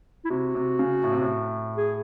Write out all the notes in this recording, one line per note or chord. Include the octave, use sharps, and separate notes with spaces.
E4
C3 F#4
C3
C#3
A2
C3
A2
G#4